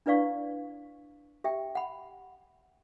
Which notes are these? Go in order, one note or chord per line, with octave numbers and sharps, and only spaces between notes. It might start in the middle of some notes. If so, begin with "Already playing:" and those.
D4 E4 B4 D5 F5 C#6
G4 E5 G5
F#5 B5